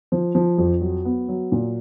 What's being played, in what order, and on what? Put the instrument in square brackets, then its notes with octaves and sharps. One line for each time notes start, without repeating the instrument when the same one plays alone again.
[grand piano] F3
F3
F2
F#3
B3
F#3
A#2